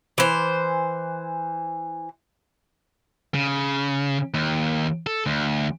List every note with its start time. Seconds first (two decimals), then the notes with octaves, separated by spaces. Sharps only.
0.18 E3 C5
3.34 C#3
4.34 D#2
5.07 A4
5.26 D2